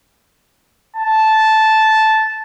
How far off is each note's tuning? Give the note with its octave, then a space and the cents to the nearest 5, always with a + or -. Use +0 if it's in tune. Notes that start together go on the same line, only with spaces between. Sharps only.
A5 -10